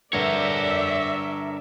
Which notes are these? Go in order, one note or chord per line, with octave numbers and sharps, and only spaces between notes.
G2 D3 A#4 C#5 D5 E5